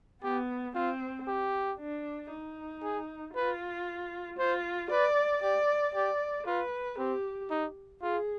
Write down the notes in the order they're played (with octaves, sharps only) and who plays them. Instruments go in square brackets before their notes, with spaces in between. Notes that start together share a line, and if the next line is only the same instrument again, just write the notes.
[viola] B3 [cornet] G4
[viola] C4 [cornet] F4
[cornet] G4
[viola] D4
D#4
[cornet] G#4
[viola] F4 [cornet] B4
[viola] F4 [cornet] C5
[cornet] B4 [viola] D5
[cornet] G4 [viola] D5
[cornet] G4 [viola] D5
[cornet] F4 [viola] B4
[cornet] C4 [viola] G4
[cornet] D#4
[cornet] F4 [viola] G#4